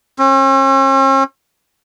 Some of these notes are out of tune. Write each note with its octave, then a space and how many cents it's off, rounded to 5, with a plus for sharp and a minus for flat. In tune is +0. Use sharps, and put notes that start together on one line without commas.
C#4 -45